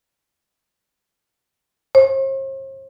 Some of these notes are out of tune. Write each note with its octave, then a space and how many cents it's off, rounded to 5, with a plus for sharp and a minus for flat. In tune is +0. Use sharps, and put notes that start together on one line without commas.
C5 +45